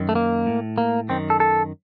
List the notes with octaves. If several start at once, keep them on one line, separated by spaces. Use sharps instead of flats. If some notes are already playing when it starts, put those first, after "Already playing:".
Already playing: F#2 D#3
A3
A#3
A2
A#3
F#2 D#3 C4
A4
A4